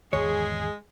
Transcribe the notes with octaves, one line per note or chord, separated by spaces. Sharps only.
G#1 E2 D3 G#3 G#4 C#5